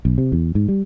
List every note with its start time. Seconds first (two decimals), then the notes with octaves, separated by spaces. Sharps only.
0.05 B1
0.18 C3
0.32 E2
0.55 G#2
0.68 G3